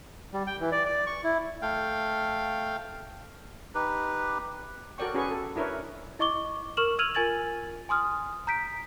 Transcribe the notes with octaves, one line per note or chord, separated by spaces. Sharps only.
G3
G5
E3
D5
D5
C#6
E4
A3 F5 G5
D#4 G4 B4
F#4 A4 A#4 D5 G5 C#6
C#4 F#4 G#4 B4 C#6
A4
D4 E4 A#4 B4 C#5
E4 D#5 C#6 D6 G7
A#4 C#6 F6 E7 F#7
E6 F6 G#6 D#7 F7 F#7
F4 A#4 G#5 G#6 A6 F#7
G#5 C6 D#6 F6
A#5 G6 B6 D7